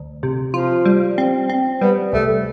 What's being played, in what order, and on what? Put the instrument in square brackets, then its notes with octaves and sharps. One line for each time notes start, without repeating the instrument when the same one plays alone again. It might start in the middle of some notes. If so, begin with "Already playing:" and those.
Already playing: [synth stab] D2
C3
[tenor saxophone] F3 [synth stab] F4
[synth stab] G3
C4
C4
[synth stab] G3 [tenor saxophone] B3
[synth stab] C2 [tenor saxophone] A3